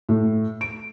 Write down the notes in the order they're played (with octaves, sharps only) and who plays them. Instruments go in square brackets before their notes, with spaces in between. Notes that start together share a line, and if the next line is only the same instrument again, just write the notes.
[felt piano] A2
D7